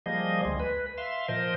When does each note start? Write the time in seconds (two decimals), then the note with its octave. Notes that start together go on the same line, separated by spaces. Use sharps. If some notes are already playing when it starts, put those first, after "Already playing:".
0.06 F3 G3 A#3 G#4 D#5
0.45 D2 G#3
0.60 B4
0.98 E5 F5 C6
1.28 A#2 F3 A#4 C5 D#5